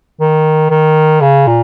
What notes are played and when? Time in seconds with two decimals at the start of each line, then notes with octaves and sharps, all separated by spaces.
0.21 D#3
0.71 D#3
1.21 C#3
1.47 A#2